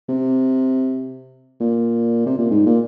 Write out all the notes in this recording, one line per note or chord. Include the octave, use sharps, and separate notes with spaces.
C3
A#2
C3
A#2
G#2
A#2